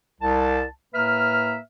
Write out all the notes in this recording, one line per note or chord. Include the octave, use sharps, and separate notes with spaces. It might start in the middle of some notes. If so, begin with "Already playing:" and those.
C2 A5
A2 A#3 B4 E5 F6